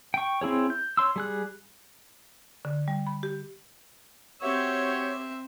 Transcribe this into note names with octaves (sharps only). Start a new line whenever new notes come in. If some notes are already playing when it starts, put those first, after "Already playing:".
G5 C#6
C4 E4 G#4 C#5
G6
C#5 C6 E6
G3 G#4 F#6
D3
G3
B5
G4
C4 F#4 G4 C#5 E5